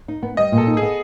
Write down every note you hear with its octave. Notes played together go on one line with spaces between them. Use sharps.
D#4
B3
G3 D#5
A#2
A4
D#4
G#4
B3